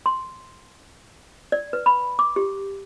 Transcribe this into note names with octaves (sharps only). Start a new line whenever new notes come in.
C6
D5
B4
B5
D6
G4